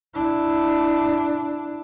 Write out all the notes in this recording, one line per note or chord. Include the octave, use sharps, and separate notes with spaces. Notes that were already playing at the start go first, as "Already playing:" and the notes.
D4 E4